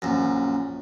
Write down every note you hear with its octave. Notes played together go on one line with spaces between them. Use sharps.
A#1 F#2